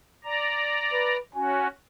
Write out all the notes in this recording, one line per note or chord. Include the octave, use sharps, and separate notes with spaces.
D5 A#5
B4
C#4 F#4 G#5